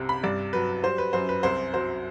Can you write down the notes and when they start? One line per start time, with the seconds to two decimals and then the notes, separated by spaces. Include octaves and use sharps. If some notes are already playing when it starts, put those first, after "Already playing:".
Already playing: C2 C3
0.09 B5
0.23 G2 D5
0.53 F#3 B4
0.83 G3 C5
0.98 B4
1.13 F#2 C5
1.29 B4
1.43 C2 C5
1.74 F#3 C5